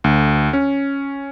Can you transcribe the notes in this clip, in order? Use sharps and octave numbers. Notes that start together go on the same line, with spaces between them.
D2
C#4